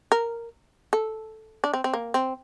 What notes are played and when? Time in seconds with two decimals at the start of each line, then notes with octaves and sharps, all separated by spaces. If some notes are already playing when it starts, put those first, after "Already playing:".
0.12 A#4
0.93 A4
1.64 D4
1.74 C4
1.84 C4
1.94 A#3
2.14 C4